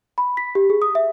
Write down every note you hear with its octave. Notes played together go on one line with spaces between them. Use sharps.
B5
B6
G4
G#4
D#6
E5